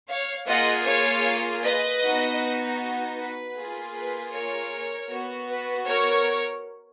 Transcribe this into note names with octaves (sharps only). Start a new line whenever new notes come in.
C#5 F5
A#3 F4 G#4 D#5 F#5
C#5 F5
B4 D#5
B3 D#4 F#4
B4
A#3 F4 G#4
B4
A#4 C#5
B3 F#4
B4
A#4 C#5